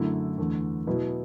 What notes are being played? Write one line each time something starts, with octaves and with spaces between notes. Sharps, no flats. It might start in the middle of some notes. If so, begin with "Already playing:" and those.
Already playing: F#2 D3 A3 E4
E2 D3 A3
B2 F#3 B3 E4